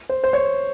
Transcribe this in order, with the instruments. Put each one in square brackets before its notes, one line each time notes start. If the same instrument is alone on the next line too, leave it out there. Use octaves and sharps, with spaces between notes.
[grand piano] C5
C5
C#5